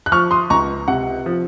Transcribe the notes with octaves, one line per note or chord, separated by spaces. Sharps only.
F#6
F3 C#6 F6
C6 D#6
C#2 A#5 C#6
C3 F#5
F3